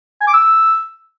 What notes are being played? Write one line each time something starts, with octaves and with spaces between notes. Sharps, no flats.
G#5
D6
E6